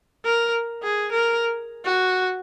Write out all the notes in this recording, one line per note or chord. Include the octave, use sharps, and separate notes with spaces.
A#4
G#4
A#4
F#4